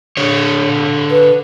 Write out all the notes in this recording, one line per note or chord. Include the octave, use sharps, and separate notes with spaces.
D3 C#5
B4